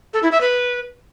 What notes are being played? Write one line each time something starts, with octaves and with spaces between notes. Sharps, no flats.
A4
E4
E5
B4